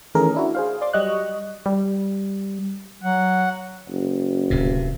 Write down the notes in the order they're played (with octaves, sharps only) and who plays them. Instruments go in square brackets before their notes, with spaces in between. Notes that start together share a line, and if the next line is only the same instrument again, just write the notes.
[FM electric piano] D#3 E3 A3 C#4 G#4 A#4
D4 E4 F#4
G#4 C5 F5
D5 C6 D6
F#3 G3 D#5 C#6 F#6
[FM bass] G3
[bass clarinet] F#3 [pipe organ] F#5
[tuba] F#1
[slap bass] D1 C3